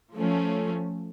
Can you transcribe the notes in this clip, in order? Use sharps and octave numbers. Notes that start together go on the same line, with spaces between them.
F3 A3 C#4